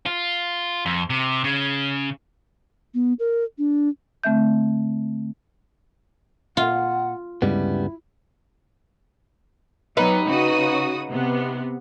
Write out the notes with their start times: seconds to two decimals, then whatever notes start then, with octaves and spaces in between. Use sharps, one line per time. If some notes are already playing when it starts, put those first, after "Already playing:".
0.06 F4
0.86 F2
1.10 C3
1.44 C#3
2.94 B3
3.19 A#4
3.58 D4
4.23 D3 A3 C4 E5 G6
6.57 A#2 F4 F#5
7.42 D2 G2 C#3 G3 G#3 B3 E4
9.97 F#3 G3 B3 D#4 B4
10.26 C#3 F#4 D#6
11.10 C3 B3